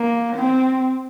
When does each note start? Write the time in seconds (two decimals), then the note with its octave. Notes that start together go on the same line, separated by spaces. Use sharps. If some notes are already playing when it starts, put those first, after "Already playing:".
Already playing: A#3
0.35 C4